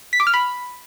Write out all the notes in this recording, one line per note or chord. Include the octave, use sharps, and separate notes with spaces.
B6
D6
F6
B5